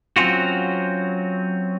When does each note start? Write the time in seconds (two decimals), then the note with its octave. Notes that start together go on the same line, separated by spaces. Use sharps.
0.16 F#3 C4 C#4 F4 F#4